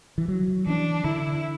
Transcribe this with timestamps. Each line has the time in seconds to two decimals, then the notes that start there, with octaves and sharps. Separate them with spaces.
0.18 E3
0.28 F#3
0.66 E3 D4
1.04 D3 E4